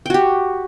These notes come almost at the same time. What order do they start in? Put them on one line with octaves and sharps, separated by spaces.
G5 F#4 G4